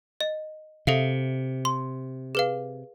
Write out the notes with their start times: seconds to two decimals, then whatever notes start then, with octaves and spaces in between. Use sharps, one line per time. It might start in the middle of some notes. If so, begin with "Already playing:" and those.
0.21 D#5
0.87 C3 A4 E5 F5
1.65 C6
2.35 G#4 B4 F5